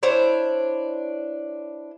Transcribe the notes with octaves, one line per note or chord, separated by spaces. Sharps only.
D4 E4 C5 C#5